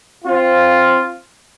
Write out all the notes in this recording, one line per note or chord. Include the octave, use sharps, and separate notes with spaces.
C4 F4